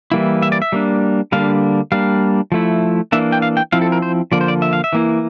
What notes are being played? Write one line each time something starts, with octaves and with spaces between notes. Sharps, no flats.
E3 G3 A#3 E4
E5
D5
E5
G3 A#3 D4
D3 G3 A#3 D4 F5
G3 A#3 D4 F5
F3 A3 E4
E3 A#3 D4 E5
G5
F5
G5
F3 C4 E4 F5
A4
A#4
C5
D3 F3 A#3 D5
C5
D5
E5
F5
E5
E3 A#3 E4